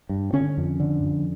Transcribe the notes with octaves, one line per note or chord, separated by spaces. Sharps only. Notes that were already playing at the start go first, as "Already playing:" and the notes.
G2
D3 C#4
F2
D3
F2